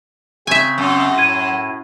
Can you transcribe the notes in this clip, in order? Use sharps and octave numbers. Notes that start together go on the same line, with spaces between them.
C#3 C4 E5 G#5
F#2
A2 G#6 D#7